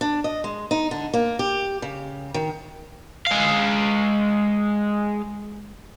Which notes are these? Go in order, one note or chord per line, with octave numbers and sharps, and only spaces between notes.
D4
D#5
G#3
D#4
D3
A#3
G4
C#3
D#3
G#3 F5